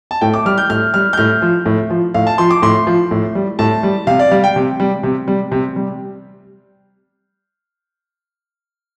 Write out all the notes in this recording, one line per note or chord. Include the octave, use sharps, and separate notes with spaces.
A5
A2 G5
D6
G3 F6
G6
A2 F6
G3 F6
G6
A2 F6
F3
A2
F3
A2 F5
A5
F3 C6
D6
A2 C6
F3
A2
G3
A2 A5
G3
C3 F5
D5
G3 F5
G5
C3
G3
C3
G3
C3
G3